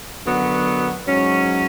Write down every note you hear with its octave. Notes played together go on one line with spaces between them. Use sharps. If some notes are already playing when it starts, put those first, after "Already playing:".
F#2 D3 F#3 B3
G#2 F#3 C#4